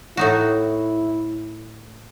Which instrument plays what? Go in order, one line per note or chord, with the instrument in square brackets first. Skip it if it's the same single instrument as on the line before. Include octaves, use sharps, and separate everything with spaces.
[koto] A2 D#4 F#4 [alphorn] E4